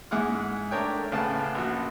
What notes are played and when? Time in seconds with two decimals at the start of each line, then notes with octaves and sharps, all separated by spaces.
0.11 G#2 E4 G#4 F#5 D6 F6
0.71 A3 D4 A#4 C#5 G5
1.12 A1 C#3 B4 F5 F#5 A5
1.55 A#1 F#4